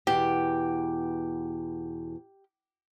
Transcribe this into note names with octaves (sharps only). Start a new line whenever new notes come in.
E2 B2 G4